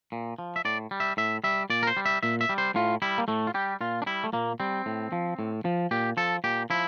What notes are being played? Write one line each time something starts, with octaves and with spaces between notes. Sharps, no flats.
A#2
F3
E5
A2 D5
G3
E5
A2 E5
G3 E5
A#2 D5
A#4
C5
G3
E5
A#2 E5
E5
G3
C5
A2 F4
G3 E4
A#3
A2 A3
F4
G3 G4
A#2 F4
D4
G3 E4
A3
A#2 A#3
G3 C4
A2
F3
A2
F3
A#2 G4
F3 A4
A#2 G4
F3 E4